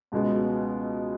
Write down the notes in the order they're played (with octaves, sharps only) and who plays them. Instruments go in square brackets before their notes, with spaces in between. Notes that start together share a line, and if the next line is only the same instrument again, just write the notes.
[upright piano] C#2 B2 G#3 B3